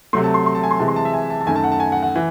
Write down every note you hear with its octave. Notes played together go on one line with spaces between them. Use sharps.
C3 F#3 A3 C6
A5
C6
C6
A5
G#5
C6
C3 E3 G#3 A5
C6
A5
E5
G#5
A5
A5
F#2 D#3 A3 G#5
A5
F#5
A5
G#5
F#5
F#5
E3